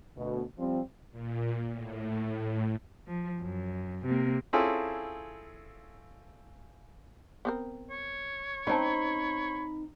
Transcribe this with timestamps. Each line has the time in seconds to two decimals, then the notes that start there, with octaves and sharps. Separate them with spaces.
0.16 D2 B2
0.58 F3 G3 C4
1.11 A#2
1.73 A2
3.07 F3
3.42 F#2
4.05 C3 A#3
4.53 C4 C#4 E4 F4 G#4 A4
7.45 B3 C4 A#4
7.90 C#5
8.67 C4 C#4 D#4 A5 B5